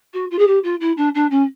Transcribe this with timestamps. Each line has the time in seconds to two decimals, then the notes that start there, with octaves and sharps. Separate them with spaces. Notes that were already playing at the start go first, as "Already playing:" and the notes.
0.13 F#4
0.30 F4
0.38 G#4
0.47 G4
0.63 F4
0.80 E4
0.97 D4
1.14 D4
1.30 C#4